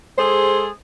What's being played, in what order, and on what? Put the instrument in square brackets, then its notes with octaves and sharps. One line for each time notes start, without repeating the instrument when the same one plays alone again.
[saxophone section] G#3 G#4 A4 C5